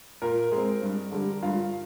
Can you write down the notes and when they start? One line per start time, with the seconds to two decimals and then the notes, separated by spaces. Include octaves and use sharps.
0.22 A#2 A#4
0.52 G#3 C4
0.82 G2
1.12 D3 G3
1.43 G2 F4 F5